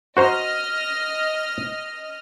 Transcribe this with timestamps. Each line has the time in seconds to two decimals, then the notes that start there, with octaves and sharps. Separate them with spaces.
0.17 F#4 C5 D#5 A#5 F6